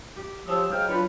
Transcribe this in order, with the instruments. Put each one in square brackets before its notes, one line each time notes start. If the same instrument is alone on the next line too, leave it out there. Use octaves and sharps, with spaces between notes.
[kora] G4
[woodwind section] F3 E6 [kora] C#4 F4 [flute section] G4 D#6
[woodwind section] G#2 G5 F6 [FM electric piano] F#3 [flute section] F5
[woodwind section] D4 B4 [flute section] F4 [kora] C#5